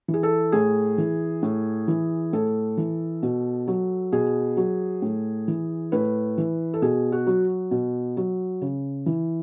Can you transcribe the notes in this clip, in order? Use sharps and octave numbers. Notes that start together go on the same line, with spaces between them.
E3
G#4
A4
A2 G#4
E3
A2
E3
A2 A4
E3
B2
F#3
B2 G#4
F#3
A2
E3
A2 B4
E3
A4
B2 G#4
F#4
F#3
B2
F#3
C#3
E3